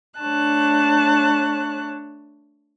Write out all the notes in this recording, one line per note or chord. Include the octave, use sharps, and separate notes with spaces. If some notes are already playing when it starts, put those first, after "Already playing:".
A3 D4 C#5 A5 F#6